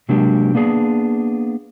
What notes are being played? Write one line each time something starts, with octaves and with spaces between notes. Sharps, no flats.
C3 F#3 G#3 A#3 D4 G4
A#3 B3 D4 G#4